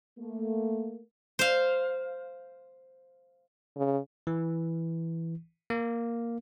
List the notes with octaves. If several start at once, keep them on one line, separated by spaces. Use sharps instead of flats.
A3 A#3
C5 F5
C#3
E3
A#3